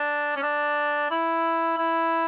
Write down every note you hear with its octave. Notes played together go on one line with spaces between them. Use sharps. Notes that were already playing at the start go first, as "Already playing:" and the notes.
Already playing: D4
C#4
D4
E4
E4